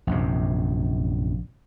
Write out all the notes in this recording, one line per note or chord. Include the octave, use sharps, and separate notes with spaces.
A#1 F#2 C3